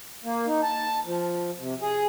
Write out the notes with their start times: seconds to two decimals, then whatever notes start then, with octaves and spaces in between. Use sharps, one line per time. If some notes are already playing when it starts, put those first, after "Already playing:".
0.24 A#3
0.47 D#4
0.63 A5
1.05 F3
1.58 C3
1.82 G#4